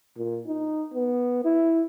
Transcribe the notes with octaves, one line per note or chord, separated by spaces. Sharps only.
A#2
D#4
B3
E4